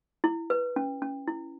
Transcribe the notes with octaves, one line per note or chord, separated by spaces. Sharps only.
E4
B4
C#4
C#4
E4